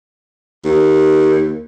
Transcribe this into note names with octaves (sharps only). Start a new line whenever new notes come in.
D#2